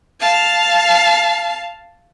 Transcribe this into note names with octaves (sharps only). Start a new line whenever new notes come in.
F5 A5